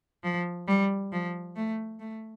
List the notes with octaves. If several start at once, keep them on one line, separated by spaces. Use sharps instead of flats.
F3
G3
F3
A3
A3